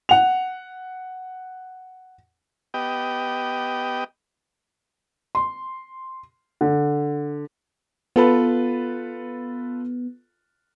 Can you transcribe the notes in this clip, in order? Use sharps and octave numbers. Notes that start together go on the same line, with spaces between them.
F#5 F7
B3 G4 D#5 G5
C6
D3
B3 F4 A4 B4